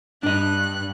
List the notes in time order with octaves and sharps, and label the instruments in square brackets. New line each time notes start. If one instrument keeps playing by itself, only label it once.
[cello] G2 [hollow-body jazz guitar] D4 D#5 [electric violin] F#6